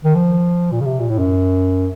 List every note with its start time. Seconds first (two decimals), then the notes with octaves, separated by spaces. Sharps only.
0.04 D#3
0.15 F3
0.72 A#2
0.81 C#3
0.86 C3
1.00 A#2
1.10 A2
1.19 F#2